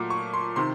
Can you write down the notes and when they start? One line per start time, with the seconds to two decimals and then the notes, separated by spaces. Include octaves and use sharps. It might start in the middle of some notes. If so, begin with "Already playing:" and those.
Already playing: A#2 F#3 A3 D6
0.10 C#6
0.34 C6
0.56 C3 D#3 C6